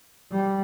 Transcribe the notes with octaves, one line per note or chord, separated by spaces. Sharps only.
G3